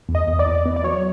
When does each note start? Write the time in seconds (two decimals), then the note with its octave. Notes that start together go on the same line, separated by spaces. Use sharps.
0.09 E2
0.15 D#5
0.28 E2
0.39 D5
0.46 E2
0.65 B3
0.76 D5
0.84 F#3 C#5